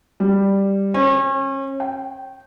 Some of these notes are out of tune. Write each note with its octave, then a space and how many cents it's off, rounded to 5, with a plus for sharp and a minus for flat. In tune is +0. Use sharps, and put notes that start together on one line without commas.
G3 +5
C#4 -35
G5 -15